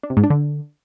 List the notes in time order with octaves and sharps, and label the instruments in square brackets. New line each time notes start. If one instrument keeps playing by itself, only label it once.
[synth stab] D4
C3
G#2
D4
D3